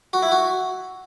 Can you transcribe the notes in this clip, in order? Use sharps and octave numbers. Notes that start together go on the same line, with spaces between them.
F#4
E4
F#4